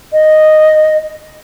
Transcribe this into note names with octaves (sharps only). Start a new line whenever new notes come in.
D#5